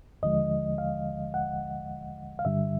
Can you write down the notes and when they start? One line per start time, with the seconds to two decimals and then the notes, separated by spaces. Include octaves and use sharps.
0.23 D#2 D3 F3 G#3 D#5
0.78 F5
1.34 F#5
2.39 F5
2.45 G2 D3 G3 E5